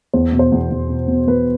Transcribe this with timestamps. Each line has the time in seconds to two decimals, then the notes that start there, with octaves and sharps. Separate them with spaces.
0.13 E2 C5
0.32 B2
0.39 C5
0.52 E2
0.70 E2
0.89 B2
1.08 B2
1.27 E2 B4